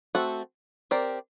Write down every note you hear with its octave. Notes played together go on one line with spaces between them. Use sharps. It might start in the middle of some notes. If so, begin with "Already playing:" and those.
A3 C4 F#4 A4
C4 G4 A#4 D5